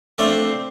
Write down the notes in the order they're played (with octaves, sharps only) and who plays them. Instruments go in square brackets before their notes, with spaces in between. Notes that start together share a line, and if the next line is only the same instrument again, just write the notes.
[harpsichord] A3 D4 F4 A4 [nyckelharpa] C4